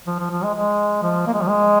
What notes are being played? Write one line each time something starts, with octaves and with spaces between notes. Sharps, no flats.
F3
F3
F3
G#3
G#3
F3
A#3
G#3
F3
G#3